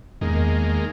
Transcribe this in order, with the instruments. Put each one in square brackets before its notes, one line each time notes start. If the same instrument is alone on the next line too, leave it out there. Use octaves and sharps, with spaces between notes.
[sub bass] E2 [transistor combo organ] D#3 G#3 A#3